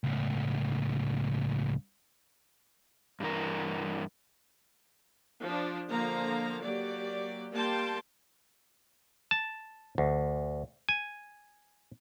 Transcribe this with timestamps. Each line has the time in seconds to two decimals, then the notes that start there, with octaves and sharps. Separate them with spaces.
0.04 C#2 A2
3.20 G2 E3 A#4
5.42 F3 D4
5.89 D3 F3 A#3 F5 A#5
6.63 F#3 A#3 G4 D5
7.52 G3 A#3 G5 A5 C6
9.31 A5
9.98 D2
10.89 G#5